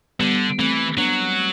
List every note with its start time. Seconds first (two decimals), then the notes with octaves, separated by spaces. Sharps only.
0.19 D3 G3 B3
0.58 E3 A3 C4
0.97 F#3 B3 D4